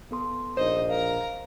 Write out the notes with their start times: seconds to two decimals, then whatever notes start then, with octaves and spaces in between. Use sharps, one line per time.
0.11 B3 A4 C6
0.57 A#1 D#4 C5 D#5
0.89 A#4 F5 A#5